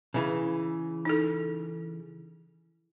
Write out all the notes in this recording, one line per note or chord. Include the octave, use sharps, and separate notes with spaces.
C#3 E3
D#4 A4